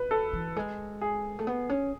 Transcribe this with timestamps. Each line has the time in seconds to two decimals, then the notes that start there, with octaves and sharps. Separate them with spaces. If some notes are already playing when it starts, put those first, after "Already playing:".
Already playing: B4
0.11 A4
0.33 E3
0.56 G#3
1.01 G#4
1.39 A3
1.47 B3
1.69 C#4